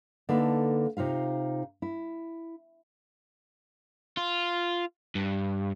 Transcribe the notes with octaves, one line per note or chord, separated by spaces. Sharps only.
D3 A#3 D#4 A4 B4
C3 D#4 F4 F5
E4
F4
G2